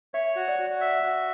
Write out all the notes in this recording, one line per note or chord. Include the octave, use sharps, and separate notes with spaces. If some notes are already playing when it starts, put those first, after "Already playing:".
C#5 E5
F#4
D5
F#4
E5
F#4